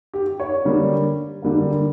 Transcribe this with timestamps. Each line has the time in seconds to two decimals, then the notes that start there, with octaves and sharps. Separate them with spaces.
0.14 G4
0.40 C#5
0.65 D3 G3 A#3
1.42 D3 G3 A#3